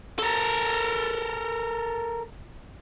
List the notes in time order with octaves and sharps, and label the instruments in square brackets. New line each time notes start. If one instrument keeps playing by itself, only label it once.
[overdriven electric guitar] A4 A#4